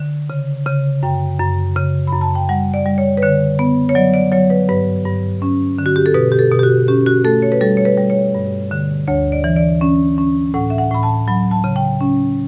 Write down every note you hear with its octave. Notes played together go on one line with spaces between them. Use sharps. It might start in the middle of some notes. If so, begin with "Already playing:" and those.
Already playing: D3
C#3
C#3
F#2 G5
F#2
C#3
B5
F#2
A5
G5
G3 F#5
D5
G3
C#5
B4
D3 C#5
B3
C#5
F#3 D5
D5
F#3 C#5
B4
G2 B4
G2
C#4
D3
F#4
G4
A4
B2 B4
G4
A4
B2
G4
F#4
C#4 G4
F#4
A3 A4
C#5
B4
G3 A4
C#5
B4
G3
C#5
G2
D3
D2 C#5
D5
E3
D5
C#4
C#4
A2 F#5
E5
F#5
A2 B5
A5
F#3 B5
A5
C#3
G5
C#4